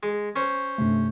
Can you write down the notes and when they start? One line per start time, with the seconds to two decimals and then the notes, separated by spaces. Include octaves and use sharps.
0.03 G#3
0.36 C#4 C5
0.78 G2 C3 A3